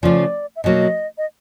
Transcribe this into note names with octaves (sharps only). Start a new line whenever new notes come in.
C#3 F3 A3 C#4 F4 D5
E5
B2 F#3 A#3 D#5
D#5